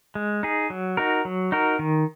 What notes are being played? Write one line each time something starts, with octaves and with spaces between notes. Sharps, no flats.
G#3
D#4 G#4
F#3
D#4 F#4 A#4
F#3
D#4 F#4 A#4
D#3